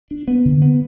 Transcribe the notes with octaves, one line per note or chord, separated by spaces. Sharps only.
D4
B3
D3
B3